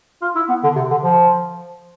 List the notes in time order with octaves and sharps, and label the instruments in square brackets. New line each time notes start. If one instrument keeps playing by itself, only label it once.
[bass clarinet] F4
E4
B3
D3
C3
D3
F3